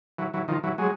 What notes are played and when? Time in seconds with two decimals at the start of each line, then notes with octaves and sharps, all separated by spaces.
0.18 E3 F#3
0.34 E3 F#3
0.48 D#3 F3
0.64 E3 F#3
0.78 F#3 G#3